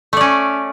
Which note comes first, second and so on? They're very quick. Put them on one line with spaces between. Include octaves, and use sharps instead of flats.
A3 D5 C#4